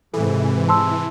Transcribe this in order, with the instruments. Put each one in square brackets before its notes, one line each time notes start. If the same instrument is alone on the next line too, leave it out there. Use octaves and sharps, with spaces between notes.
[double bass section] G#2 C3 [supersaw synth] E3 [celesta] A4
[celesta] A5 C6 E6